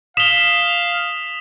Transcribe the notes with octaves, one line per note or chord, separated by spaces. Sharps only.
F5 D#6 B6 E7 F7 G7